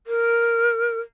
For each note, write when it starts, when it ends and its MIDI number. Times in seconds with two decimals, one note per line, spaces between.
0.07 0.99 70